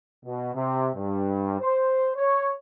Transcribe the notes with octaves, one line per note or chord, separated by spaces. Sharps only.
B2
C3
G2
C5
C#5